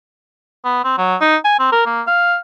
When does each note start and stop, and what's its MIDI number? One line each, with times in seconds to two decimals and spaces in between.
0.65 0.80 59
0.84 0.96 60
0.98 1.16 54
1.21 1.36 63
1.44 1.55 80
1.59 1.72 60
1.72 1.82 70
1.86 2.02 58
2.07 2.36 77